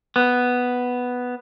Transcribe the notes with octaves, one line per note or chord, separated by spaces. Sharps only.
B3